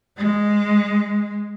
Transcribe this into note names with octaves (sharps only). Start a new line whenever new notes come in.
G#3